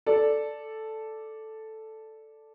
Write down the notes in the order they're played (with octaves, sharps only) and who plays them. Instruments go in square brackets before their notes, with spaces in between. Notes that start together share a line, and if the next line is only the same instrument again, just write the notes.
[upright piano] A4 D5